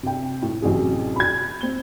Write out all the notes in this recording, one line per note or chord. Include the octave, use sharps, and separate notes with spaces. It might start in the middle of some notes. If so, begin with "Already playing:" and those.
C3 G5
A2
A1 F#2 C3 G#4
B5 G#6
C4 G7